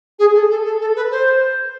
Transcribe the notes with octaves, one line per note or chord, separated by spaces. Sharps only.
G#4
A4
A4
A4
A4
B4
C5